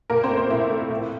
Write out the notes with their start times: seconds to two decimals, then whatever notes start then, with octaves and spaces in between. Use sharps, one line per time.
0.10 A#2 A#3 A#4
0.24 C4 C5
0.30 A3
0.37 C4 C5
0.50 A#2 E4 E5
0.70 A3
0.91 A2